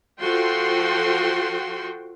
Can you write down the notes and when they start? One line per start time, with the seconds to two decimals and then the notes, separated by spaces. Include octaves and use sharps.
0.21 F3 F4 F#4 A4 G5 C6